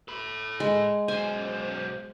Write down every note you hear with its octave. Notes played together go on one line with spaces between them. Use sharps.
A4 B5
G#3
B1 C5 G#5